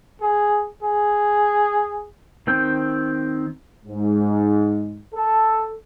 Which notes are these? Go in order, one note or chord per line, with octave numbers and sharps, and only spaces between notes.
G#4
G#4
D#3 C4 G5
G#2
A4